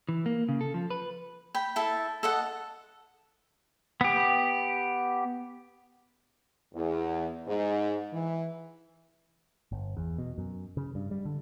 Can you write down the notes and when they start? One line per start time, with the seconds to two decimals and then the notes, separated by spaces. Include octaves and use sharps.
0.09 E3
0.26 A#3
0.49 C#3
0.61 A4
0.74 F3
0.90 B4
1.55 G5 B5
1.76 E4 A4 A5
2.23 A4 D#5 F#5
4.01 B3 G4
6.74 E2
7.47 G#2
8.12 E3
9.72 G1
9.97 E2
10.18 B2
10.38 F#2
10.77 C#3
10.95 G2
11.11 G3
11.25 D3